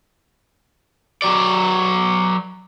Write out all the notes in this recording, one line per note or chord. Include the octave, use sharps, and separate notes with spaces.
F#3 D5